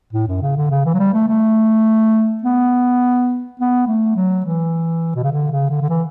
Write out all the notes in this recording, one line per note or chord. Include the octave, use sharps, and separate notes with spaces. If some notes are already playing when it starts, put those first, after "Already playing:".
A2
F#2
C#3
D3
C#3
E3
F#3
G3
A3
A3
B3
B3
A3
F#3
E3
B2
C#3
D3
C#3
D3
D3
E3